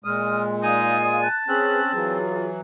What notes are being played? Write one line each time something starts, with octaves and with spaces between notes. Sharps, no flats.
A#2 G#3 D#6 F6
D#4 D5 F5 G#5 D#6
A5 F#6
C4 C#4 G#4 B4 F#6
E3 F#3 F4 G#4